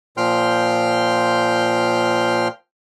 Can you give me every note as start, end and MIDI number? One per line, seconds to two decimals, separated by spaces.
0.17 2.48 46
0.17 2.48 53
0.17 2.48 79
0.17 2.48 84
0.17 2.48 89
0.17 2.48 91